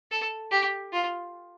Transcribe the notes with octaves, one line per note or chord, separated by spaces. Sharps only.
A4
G4
F4